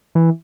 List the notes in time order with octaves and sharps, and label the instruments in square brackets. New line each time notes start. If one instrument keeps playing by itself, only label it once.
[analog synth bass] E3